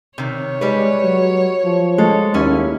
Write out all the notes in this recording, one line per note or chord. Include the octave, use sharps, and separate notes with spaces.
C3 D#3 C#5
G3 G#3 B4
F#3
F3
G#3 A4
D#2 D#3 C#4 E4